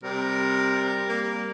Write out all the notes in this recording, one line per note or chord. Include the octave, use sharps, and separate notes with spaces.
C3 G3 A#4
A#3